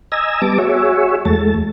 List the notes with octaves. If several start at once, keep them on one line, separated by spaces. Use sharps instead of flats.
D#5 G#5 A#5 E6
G3 B3 A5 D6
F#4 G#4 C#5 E5
E2 G#3 A3 A5